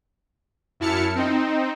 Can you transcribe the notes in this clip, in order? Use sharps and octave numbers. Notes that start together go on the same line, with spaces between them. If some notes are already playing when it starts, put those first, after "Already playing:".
F#2 E4 A5 F6 C#7
C4 D#4